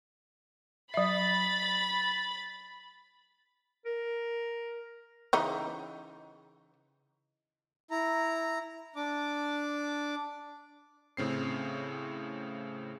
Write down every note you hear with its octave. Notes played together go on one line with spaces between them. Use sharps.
F#3 E5 B5 A6
A#4
C#3 E3 D#4
E4 A#5
D4 D6
A2 C#3 C4 C7